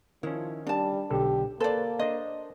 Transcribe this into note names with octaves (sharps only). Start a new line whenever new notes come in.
D#3 F3 C#4 E4
G3 D4 A5
B1 D3 G4 A4
A#3 A4 B4 C5 D5
D4 C5 D#5